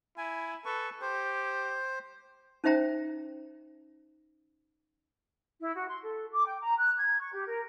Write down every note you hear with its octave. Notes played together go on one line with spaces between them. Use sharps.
E4 G#5
A4 B4 C#6
G4 C5
C#4 D#4 C5 E5 G5 A#5
E4
F#4
C6
A4
D6
G5
A#5
F#6
G#6
C#6
G4
A#4